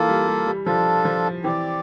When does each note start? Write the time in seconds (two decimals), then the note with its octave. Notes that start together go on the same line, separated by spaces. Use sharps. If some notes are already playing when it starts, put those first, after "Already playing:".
Already playing: E3 A#3 F4 A4
0.08 G3
0.27 G3
0.47 G3
0.66 F3 D4 F4 A4
1.05 F3
1.44 E3 C4 G4 D5